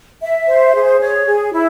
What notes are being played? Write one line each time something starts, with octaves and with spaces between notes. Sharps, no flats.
E5
C5
G#4
C#5
G#4
E4